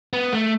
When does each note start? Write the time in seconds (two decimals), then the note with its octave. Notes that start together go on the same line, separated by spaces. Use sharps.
0.13 B3
0.33 A3